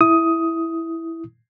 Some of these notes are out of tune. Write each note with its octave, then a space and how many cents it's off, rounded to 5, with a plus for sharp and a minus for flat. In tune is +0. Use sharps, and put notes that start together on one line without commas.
E4 +0 D#6 +10